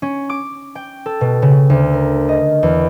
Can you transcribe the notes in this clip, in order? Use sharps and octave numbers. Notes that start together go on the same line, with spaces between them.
C#4
D6
G5
A4
B2
C#3
D2
A#4
D#5
E2